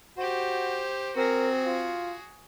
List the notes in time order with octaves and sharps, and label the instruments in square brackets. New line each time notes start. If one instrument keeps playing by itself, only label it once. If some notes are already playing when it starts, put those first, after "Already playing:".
[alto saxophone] F#4 [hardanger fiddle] G4 C5
[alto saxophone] C4 [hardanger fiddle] F#4 G#4 [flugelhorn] A#4
[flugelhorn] F4